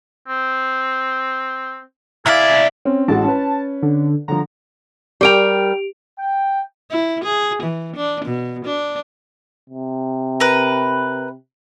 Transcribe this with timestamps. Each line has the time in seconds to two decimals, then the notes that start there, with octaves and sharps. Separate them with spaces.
0.28 C4
2.26 C3 E4 G#4 D5 E5 F5
2.85 C4 C#4
3.08 A1 G#3 F#4 A5
3.24 C#4 B4
3.82 D3
4.28 D3 F3 A#5
5.21 G3 G4 A#4 G5 D7 F7
6.19 G5
6.91 E4
7.24 G#4
7.62 E3
7.96 D4
8.25 B2
8.65 D4
9.69 C3
10.40 A#4 B4